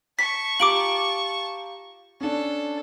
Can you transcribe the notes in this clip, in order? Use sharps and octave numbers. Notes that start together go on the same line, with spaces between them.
A5 C#6 B6
F4 G4 A#5 D6 D7 F#7
C#4 D4 A4